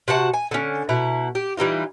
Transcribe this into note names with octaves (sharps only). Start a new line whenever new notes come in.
C3 F#4 F#5 A5
G#5
D3 C#4
B2 E4 A#5
G4
E3 G3 D#4 F4